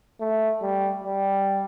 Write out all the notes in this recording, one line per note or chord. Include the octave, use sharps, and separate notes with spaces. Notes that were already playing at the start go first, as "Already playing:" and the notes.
A3
G3
G3